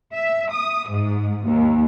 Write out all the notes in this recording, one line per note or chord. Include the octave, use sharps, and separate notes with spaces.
E5
D#6
G#2
D#2